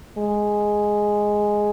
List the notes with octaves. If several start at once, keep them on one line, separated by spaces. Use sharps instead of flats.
G#3